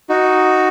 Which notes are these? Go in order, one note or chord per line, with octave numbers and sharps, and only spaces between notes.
D#4 F#4